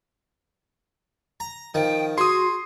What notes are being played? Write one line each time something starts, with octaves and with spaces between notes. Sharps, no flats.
A#5
D#3 F3 G5
F#4 G#4 C6 D#6